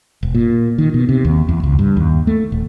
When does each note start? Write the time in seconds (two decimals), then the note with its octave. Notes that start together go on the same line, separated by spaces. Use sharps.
0.23 E1
0.35 A#2
0.78 D#3
0.94 B2
1.09 C3
1.25 D#2
1.49 E2
1.63 C#2
1.79 G2
1.97 D#2
2.27 A3
2.52 D#1